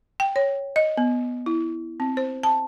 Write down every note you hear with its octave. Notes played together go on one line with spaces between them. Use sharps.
G5
C#5
D#5
B3
E4
C4
C5
A5